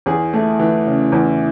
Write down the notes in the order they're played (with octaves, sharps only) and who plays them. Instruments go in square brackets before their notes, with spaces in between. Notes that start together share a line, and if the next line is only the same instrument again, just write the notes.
[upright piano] E2 G#4
A3
E3
C#3
E2